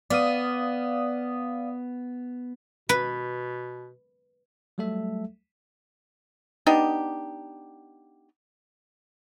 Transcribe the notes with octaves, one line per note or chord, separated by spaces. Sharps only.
B3 D5 F5 D#6
B2 B4
F#3 G3 A3 A4 E5
B3 D4 D#4 G4